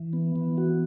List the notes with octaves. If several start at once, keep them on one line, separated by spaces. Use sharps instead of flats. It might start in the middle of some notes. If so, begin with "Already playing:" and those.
Already playing: E3
B3
E3
F#4